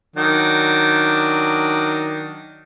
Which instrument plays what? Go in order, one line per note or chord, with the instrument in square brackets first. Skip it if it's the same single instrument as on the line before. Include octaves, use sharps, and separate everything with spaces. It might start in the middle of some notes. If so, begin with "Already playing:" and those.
[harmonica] D#3 F#3 D4